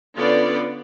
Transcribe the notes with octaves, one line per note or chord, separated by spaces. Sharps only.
D3 B3 C#4 F4 D5